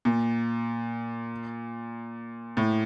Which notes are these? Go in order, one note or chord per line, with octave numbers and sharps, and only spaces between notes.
A#2
A2